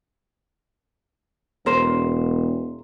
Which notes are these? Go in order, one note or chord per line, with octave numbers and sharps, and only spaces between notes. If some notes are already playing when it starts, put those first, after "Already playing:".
E1 A#4 C5